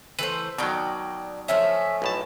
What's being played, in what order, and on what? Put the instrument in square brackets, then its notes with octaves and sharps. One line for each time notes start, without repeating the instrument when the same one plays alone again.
[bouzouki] E3 A3 C5 [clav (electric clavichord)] B4
[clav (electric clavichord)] B2 D#3 F#3 [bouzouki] D5 G5
[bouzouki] F3 A3 C#4 [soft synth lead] E5
[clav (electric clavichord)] B1 A2 A5